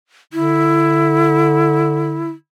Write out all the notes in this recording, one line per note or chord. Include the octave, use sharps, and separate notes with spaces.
D3 E4